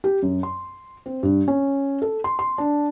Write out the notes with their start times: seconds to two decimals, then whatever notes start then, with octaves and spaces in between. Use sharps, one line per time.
0.04 G4
0.22 F#2
0.43 C6
1.06 C4
1.23 G2
1.48 C#4
2.02 A4
2.24 C6
2.39 C6
2.58 D4